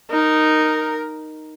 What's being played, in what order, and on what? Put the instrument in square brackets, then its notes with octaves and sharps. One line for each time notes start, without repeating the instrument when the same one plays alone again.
[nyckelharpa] D#4 [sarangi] A#4